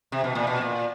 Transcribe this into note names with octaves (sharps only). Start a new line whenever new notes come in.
C3
B2
A#2
B2
A#2